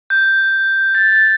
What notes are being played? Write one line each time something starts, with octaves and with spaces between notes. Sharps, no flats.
G6
A6
A6